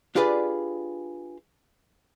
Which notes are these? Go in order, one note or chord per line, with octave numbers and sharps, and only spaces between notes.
D4 F4 G4 G#4 B4 D5